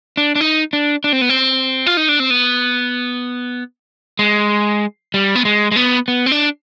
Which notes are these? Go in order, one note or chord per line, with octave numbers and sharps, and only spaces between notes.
D4
D4
D#4
D4
D4
C4
B3
C4
F4
D#4
D4
C4
B3
G#3
G3
B3
G#3
G#3
B3
B3
C4
D4